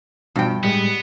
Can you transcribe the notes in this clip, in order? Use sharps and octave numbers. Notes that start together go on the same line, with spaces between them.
G2 B2 F3 G5
A2 G3 G#3 B3